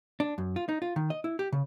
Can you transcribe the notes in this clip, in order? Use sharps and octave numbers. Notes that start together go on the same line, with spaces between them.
D4
F#2
F4
D#4
F4
D#3
D#5
E4
G4
C#3